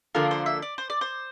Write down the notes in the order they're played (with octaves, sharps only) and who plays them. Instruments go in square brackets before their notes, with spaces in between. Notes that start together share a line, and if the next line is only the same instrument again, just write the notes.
[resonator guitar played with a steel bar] D3 F3 A#3 F4 A4 [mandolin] A#4
[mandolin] C5
E5
D5
C5
D5
C5